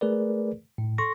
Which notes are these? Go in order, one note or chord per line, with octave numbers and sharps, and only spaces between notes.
A3 G#4 A#4 B4 D5
A2
A4 C6 C#6 A#6